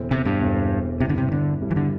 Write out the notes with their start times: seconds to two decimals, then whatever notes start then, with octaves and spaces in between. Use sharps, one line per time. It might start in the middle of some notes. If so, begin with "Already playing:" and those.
Already playing: E1 E2 D3 C4 E4
0.11 C3
0.25 G2
0.41 E1 E2 D3 C4 E4
1.00 G1 G2 C3 G3 E4
1.09 D3
1.18 C3
1.32 D3
1.61 G1 G2 G3 E4
1.71 E3
1.76 D3